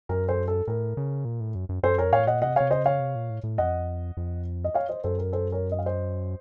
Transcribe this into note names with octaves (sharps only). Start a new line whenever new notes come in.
F#2 A#4
A4 C5
A4
A2 A#4
C#3
A#2
A2
F#2
F#2
F#2 A4 C5
F2 A#4 C#5
A2 C#5 F5
A#2 D#5 F#5
C3 D#5 F#5
C3 C#5 F5
C#3 C5 D#5
C#5 F5
C3
A#2
A2
A2
F2 D#5 F#5
F2
D#5
C#5 F5
C5 D#5
F#2 A4 C5
A#4
A4 C5
A#4 C#5
D#5
F5
C5 D#5